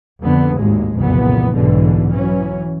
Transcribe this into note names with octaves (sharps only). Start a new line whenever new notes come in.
F2 D3 B3
G#1 D#2 A2 G#3
F#1 C2 F2 A#2 E3 B3
B1 G#2 B2 D3 E3
E3 F#3 C#4